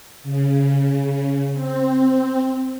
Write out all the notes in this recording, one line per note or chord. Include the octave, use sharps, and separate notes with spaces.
C#3
C4